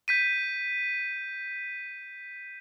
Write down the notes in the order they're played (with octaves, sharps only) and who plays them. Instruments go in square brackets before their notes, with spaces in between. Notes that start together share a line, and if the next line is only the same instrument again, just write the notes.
[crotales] G6 B6 D#7